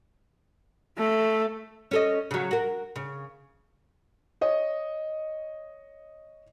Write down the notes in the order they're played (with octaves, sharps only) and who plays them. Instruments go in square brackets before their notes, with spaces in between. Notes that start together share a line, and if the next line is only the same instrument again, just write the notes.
[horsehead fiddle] A3
[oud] C#4 A4 D#5
C#3 F#3
F#4 A#4
C#3
[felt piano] C#5 D#5